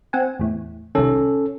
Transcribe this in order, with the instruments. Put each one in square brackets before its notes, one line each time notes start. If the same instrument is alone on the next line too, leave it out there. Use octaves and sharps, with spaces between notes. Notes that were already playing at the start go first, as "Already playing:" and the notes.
[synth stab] C4 F#5 G#5
E2 A2
[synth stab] C2 D#3 [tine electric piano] C#4 A4